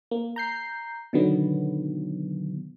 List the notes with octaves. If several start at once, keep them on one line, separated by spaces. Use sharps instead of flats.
A#3
A#5 G6 C7
B2 D3 D#3 F#3 B3